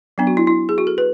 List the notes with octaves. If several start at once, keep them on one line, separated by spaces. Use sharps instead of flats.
F#3 B3 D4
F#4
E4
E4
G#4
F#4
A4
B4